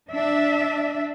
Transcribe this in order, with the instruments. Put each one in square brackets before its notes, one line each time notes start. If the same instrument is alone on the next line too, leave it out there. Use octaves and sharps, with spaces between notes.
[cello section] D4 E5